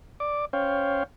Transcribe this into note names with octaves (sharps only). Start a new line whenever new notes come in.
D5 D6
C#4 C5 C#5 F5 G5